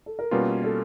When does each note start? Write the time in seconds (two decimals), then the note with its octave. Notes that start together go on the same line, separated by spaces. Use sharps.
0.06 A4
0.19 A#4
0.31 B2 G3 A#3 C#4 F4 B4
0.64 A4